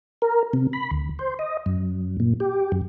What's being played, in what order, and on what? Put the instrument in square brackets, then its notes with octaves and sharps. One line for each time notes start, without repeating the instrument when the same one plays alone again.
[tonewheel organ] A#4
C3
B5
D2
C5
D#5
F#2
A#2
G4
F#2